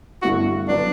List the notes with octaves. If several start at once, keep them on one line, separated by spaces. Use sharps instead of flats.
G2 D3 A3 E4 F#4
D3 F#3 B3 D4